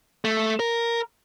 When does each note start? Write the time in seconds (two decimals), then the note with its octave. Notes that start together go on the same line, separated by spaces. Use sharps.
0.25 A3
0.60 A#4